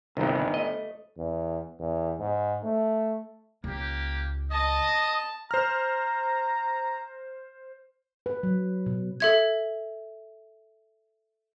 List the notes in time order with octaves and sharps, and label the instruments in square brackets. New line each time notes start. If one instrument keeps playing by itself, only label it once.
[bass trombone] G1 [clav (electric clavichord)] C2 G2 [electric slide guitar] D3 D#3
[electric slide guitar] A3 [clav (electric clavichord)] D#5
[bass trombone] E2
E2
G#2
A3
[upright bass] C#2 [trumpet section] A#3 G4
[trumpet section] D#5 [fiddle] A5 [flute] D#6
[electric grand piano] C5 F6 [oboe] A#5
[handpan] B4
F#3
B2
[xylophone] A4 E5 G#6